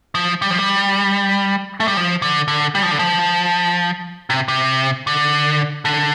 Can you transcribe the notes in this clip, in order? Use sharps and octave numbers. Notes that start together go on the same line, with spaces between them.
F3
G3
F3
G3
A3
G3
F3
D3
D3
G3
F3
D3
F3
C3
C3
D3
D3